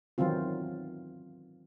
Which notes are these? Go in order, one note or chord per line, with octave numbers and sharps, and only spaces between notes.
D#3 E3 F#3 C4 F4